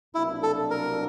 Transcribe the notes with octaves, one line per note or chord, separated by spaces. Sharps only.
C2 B2 F#3 A#3 D4 E4
A4
A#4